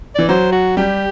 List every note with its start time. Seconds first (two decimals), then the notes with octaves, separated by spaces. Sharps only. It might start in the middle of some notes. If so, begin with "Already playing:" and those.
0.15 E3 D5
0.29 F#3 C5
0.52 F#4
0.77 G3 G4